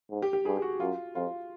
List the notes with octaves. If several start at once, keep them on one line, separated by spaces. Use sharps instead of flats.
G#2
G4
G4
G2 G#4
G4
F#4
F#2 F4
F2 F4